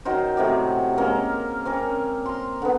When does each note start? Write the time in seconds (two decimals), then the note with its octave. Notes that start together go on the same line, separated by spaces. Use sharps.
0.05 D#3 F#3 A#4 C5
0.37 A2 C3 F#3 G4
0.97 G#3 A#3 C#4 A#4
1.65 C4 C#4 A#4
2.26 A#5 C6
2.62 D3 B3